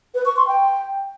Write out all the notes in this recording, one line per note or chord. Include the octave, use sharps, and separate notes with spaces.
B4
C#6
C6
G5